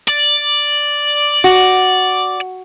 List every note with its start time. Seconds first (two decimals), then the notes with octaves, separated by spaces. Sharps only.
0.08 D5
1.44 F#4